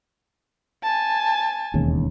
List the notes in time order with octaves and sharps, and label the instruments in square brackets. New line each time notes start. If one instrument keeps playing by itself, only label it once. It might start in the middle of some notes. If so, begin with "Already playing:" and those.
[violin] G#5 A5
[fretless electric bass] E1 D#2 C#3